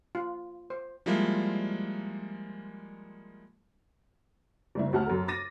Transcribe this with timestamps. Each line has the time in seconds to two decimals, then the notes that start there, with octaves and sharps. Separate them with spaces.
0.15 F4
0.70 C5
1.06 F3 G3 G#3 A#3 E4 F4
4.75 F#1 G3 E4
4.93 D2 F#4 F#5 A5 F6
5.06 F#2 A4
5.28 D6 A6 A#6 D#7